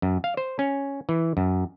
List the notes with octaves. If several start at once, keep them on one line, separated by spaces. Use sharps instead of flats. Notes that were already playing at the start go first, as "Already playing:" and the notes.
F#2
F5
C5
C#4
E3
F#2